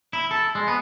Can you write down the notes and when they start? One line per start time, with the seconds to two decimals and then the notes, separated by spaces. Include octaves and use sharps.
0.13 E4
0.31 A4
0.55 G#3
0.68 B3